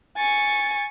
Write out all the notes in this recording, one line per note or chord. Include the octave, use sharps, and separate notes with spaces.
G#5 C#6 A6